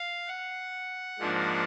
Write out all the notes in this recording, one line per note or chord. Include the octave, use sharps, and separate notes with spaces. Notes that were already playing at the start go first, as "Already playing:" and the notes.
Already playing: F5
F#5
G#2 F3 A#3 D4